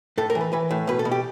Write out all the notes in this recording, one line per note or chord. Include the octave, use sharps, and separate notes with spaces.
A2 A4
A#4
E3
B4
E3 B4
A2
B2 B4
A4
B2
G4